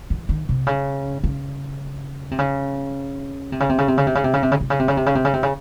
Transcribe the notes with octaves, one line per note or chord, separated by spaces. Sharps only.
E3
D#3
C3
C#3
C#3
C3
C#3
C3
C#3
C3
C#3
C3
C#3
C3
C#3
C3
C#3
C3
C#3
C3
C#3
C3
C#3
C3
C#3
C3
C#3
C3
C#3